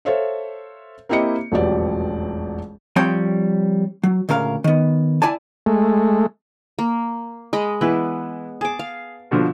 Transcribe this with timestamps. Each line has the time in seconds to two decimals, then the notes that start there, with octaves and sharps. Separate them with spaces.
0.05 A4 C5 C#5 E5 F5
1.09 A#3 C4 E4 G4 D#5 C#7
1.52 E1 A1 F2 F#3 G4 D5
2.96 F3 G3 C4 C#5 G5
4.03 F#3
4.29 D2 A#2 C#3 A#4 F5
4.64 D#3 B3
5.22 E4 D5 G#5 A5
5.66 G#3 A3
6.79 A#3
7.53 G#3 D#5 B5
7.81 E3 B3 E4 B4
8.61 G#4 A5 D6
8.79 F5
9.31 B2 D3 F3